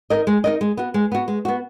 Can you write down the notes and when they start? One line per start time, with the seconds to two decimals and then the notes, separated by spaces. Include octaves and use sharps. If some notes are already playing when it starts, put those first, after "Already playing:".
0.10 D#4 A#4 D#5
0.27 G#3
0.44 D#4 A#4 D#5
0.61 G#3
0.77 B3 F#4
0.94 G#3
1.12 B3 F#4
1.28 G#3
1.45 B3 F#4